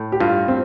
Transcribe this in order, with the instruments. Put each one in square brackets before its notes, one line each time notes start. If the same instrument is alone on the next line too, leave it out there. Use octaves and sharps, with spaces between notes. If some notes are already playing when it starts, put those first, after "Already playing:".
Already playing: [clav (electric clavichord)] A2
[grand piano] G4
[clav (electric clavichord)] G2 [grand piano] F4
[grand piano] C4